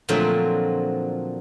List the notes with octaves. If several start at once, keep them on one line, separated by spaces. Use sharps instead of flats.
A#2 D3 F3 F#3 A3 C4